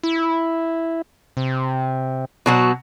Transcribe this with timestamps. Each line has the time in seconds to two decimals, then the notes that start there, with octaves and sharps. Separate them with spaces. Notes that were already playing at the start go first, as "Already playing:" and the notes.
0.04 E4
1.37 C3
2.46 B2 F#3 F#4